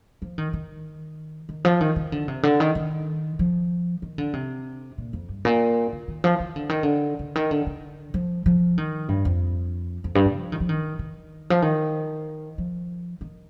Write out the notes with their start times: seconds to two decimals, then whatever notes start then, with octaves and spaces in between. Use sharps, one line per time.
0.22 F3
0.38 D#3
0.53 D#3
1.49 D#3
1.65 F3
1.81 D#3
1.96 D#3
2.12 D3
2.28 C3
2.43 D3
2.60 D#3
2.75 D#3
3.39 F3
4.02 D#3
4.18 D3
4.33 C3
4.98 A#2
5.13 F2
5.29 G2
5.45 A#2
5.92 D3
6.08 D#3
6.24 F3
6.40 D#3
6.56 D3
6.69 D#3
6.83 D3
7.19 D3
7.35 D#3
7.51 D3
7.66 D3
8.14 F3
8.46 F3
8.78 D#3
9.09 G2
9.25 F2
10.04 F2
10.15 G2
10.26 A2
10.35 F3
10.52 D#3
10.60 F3
10.69 D#3
10.99 D#3
11.50 F3
11.62 D#3
12.58 F3
13.21 D#3